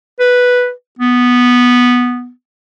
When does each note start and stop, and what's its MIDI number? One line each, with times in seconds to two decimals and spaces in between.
0.20 0.72 71
0.99 2.31 59